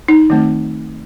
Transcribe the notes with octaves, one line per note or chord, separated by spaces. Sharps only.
D#4
D#3 F#3 A3 C4